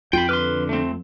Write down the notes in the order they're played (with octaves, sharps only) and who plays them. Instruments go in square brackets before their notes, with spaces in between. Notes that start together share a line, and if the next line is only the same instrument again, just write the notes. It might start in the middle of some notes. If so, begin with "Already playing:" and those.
[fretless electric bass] F2 [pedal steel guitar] F4 [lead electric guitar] G5 B5
[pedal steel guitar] D3 D6 F6 [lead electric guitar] B4 C6
[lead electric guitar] A3 C4